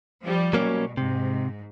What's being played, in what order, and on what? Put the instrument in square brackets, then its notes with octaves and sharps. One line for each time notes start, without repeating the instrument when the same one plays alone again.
[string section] F3 G3
[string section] B2 [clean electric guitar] F#3 A#3 C#4
[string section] G#2 [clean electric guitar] C3